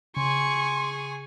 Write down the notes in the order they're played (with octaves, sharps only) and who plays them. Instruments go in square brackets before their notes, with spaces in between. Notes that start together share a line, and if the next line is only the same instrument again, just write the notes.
[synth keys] C#3 [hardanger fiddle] G#4 G#5 [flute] C6 [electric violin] C#6